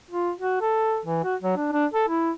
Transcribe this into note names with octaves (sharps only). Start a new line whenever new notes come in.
F4
F#4
A4
E3
F#4
F#3
D4
D4
A4
E4